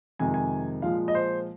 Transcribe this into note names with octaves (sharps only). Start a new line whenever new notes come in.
F2 C3 D#3 G#3 G#5
G#5
A#2 F3 G#3 F5
D#5
C5